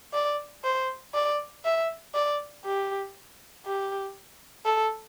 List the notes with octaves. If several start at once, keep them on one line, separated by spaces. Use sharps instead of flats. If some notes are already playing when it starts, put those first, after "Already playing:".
D5
C5
D5
E5
D5
G4
G4
A4